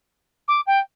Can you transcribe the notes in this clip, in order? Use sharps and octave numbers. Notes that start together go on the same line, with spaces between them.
D6
G5